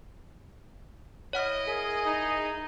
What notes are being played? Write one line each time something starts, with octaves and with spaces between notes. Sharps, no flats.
E4 C#5 D#5 F#5 F6
G#4 A#4
D#4